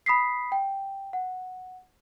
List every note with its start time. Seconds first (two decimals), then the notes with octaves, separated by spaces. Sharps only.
0.06 B5 D#6 B6 C7
0.52 G5
1.13 F#5